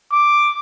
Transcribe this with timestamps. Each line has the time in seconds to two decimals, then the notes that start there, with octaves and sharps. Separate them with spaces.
0.12 D6